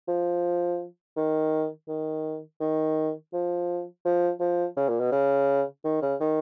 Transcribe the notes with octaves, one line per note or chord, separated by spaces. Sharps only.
F3
D#3
D#3
D#3
F3
F3
F3
C#3
A#2
B2
C#3
D#3
C#3
D#3